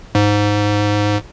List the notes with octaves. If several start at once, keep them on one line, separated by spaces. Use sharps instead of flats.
G#2